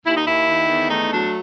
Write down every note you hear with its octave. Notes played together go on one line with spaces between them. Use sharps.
D#2 E4
D#4
D#2 E4
D#3
E2
A3 D#4
F#3 D4